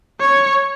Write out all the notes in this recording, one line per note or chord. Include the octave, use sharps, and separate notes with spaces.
C#5